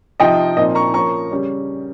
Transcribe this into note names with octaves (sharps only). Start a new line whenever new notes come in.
C3 F3 C4 D#4 D#5 G5
A#2 F3 C4 D#4 D#5
A#5 C#6
F3 A#3 C#4 A#5 C#6
C#3 G3 C#4